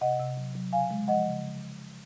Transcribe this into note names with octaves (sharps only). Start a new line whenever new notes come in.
C3 D#5 F#5
C3
F#3
F#3
C#3 F5 G#5
G#3
F3 D#5 F#5
C#3